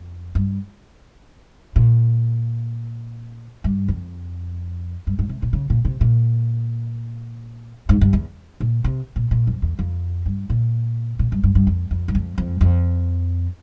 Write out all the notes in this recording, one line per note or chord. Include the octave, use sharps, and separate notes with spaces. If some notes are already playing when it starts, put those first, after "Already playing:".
Already playing: F2
G2
A#2
G2
F2
G2
G#2
C3
A#2
C#3
A#2
C3
A#2
G#2
G2
E2
A#2
C3
A#2
A#2
F2
E2
F2
G2
A#2
A#2
G2
G2
G2
F2
F2
G2
F2
F2
F2